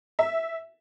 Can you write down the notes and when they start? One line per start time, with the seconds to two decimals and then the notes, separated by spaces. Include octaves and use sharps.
0.19 E5